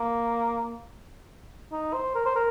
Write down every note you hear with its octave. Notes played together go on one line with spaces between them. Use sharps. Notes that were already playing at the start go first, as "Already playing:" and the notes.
Already playing: A#3
D#4
C5
A#4
C5
A#4